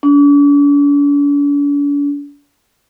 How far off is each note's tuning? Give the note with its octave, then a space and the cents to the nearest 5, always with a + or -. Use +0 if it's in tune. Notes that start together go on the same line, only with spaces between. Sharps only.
D4 -45